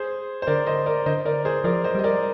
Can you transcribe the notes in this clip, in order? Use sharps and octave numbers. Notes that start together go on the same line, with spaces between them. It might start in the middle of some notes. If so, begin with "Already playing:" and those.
Already playing: G#4 C5
C5
D3 A#4 D5
C5 D#5
A#4 D5
D3 C5 D#5
A#4 D5
G#4 C5
F3 A#4 D5
C5 D#5
G3 D#5
A#4 D5